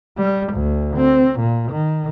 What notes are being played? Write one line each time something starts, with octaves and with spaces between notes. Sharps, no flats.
G3
D2
C4
A#2
D#3